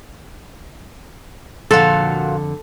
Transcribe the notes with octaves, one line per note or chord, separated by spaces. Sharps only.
F2 A#2 D3 F#4 A4 F5